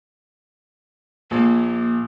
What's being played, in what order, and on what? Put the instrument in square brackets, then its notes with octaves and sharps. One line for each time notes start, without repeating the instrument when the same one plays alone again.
[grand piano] A#1 [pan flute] A#3